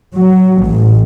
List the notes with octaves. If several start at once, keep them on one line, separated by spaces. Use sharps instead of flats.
F#3
A1